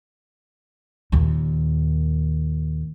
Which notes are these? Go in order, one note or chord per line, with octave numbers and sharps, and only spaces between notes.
D#2 A#2